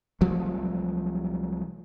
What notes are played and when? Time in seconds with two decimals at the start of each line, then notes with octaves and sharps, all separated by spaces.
0.21 C2 F3 F#3 A3